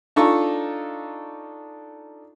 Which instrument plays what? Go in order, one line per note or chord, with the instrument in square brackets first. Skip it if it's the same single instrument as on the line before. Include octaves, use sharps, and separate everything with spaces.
[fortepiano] D4 D#4 F4 A4 A#5 C#6